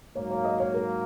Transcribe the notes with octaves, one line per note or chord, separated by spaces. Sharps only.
G#2 F#3 A#3 C#5
C#5
D#5
C#5
A#4